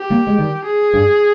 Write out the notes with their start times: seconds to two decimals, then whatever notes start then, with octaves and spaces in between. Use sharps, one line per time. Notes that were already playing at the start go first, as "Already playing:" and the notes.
Already playing: G4
0.10 G3 A#3
0.27 G#3
0.38 D#3 G3
0.66 G#4
0.94 G2